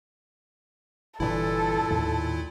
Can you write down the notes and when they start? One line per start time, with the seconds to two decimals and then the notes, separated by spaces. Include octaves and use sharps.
1.20 G1 A#2 E3 D4 E4 A4
1.90 D#2 A2 D#3